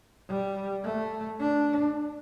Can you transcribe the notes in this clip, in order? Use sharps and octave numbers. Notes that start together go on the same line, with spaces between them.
G3
A3
D4